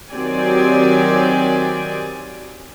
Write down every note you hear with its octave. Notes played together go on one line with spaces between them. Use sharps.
D#3 F#3 C4 G4 D5 G#5